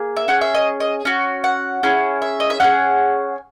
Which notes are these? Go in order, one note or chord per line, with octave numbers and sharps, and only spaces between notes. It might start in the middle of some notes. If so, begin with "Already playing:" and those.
Already playing: A#3 G#4
E5
C#4 G#4 F#5
E5
D#5
D#5
C#4 F#4
F#5
C#4 E4 G#4
E5
D#5
E5
C#4 E4 G#4 F#5